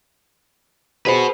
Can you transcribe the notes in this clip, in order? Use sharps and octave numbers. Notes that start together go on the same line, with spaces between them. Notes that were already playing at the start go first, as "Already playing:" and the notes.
F#4 G#4 B4 C5